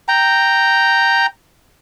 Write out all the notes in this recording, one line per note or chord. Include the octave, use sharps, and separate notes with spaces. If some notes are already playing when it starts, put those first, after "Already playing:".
G5 A#5